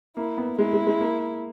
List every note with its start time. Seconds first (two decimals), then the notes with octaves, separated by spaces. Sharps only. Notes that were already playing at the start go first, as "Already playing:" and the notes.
0.17 A#3 E4
0.38 B3
0.59 G#3 E4
0.73 G#3
0.87 G#3
1.01 A#3